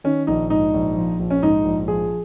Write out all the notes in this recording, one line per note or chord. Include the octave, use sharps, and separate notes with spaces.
D#3 C#4
A#1 D#4
G#2 D#4
A#1
F3
A#1
C#4
G#2 D#4
A#1
F3 G#4